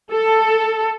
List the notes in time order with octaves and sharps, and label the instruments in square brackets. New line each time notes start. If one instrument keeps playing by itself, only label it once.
[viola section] A4